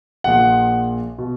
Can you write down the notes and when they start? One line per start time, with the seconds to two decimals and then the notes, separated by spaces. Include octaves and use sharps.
0.24 A#1 A#2 F3 F#5
1.18 B2